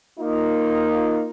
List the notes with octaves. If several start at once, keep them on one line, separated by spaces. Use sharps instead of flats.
A#3 D#4 F4